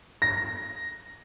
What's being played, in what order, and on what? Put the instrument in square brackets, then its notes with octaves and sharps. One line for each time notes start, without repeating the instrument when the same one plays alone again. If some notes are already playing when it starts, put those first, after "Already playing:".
[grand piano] A#6